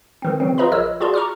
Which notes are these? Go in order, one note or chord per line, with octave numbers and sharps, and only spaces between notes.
D#3 E3 C4
C#3 E3 F#3 C4
F4 G#4 B4 D#5 A#5 B5
A#1 A#4 C#5 D#5 E6
F4 F#4 G#4 D5 A5 C6
A#5 C#6 D6 F6